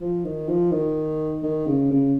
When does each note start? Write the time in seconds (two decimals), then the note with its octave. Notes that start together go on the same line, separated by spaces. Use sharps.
0.01 F3
0.25 D#3
0.48 F3
0.72 D#3
1.43 D#3
1.66 C#3
1.91 C#3